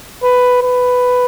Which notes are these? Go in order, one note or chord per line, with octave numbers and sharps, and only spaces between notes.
B4
B4